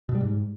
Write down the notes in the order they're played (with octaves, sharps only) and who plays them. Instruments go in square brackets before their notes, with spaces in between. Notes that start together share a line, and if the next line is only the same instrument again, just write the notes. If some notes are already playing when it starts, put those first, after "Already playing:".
[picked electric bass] B2
G3
G#2